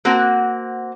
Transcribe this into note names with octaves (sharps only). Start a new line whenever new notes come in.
A#3 C4 F#4